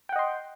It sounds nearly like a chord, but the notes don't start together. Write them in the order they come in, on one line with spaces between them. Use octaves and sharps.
G5 F#5 D#5 C6